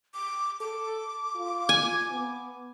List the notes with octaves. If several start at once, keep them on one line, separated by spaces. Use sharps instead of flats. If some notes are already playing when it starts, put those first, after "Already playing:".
D6
A4 D6
F4
G#5
B3